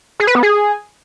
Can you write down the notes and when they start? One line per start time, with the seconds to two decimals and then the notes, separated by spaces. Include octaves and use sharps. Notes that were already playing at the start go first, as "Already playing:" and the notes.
0.20 G#4
0.27 B4
0.35 B3
0.43 G#4